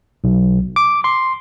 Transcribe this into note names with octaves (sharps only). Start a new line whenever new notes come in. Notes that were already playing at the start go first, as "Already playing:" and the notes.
B1
D6
C6